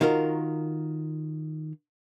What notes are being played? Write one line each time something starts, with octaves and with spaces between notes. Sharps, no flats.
D#3 F4 F#4 A#4